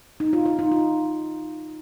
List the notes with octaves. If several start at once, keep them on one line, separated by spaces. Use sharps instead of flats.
D#4
F4
F4
D#4
F4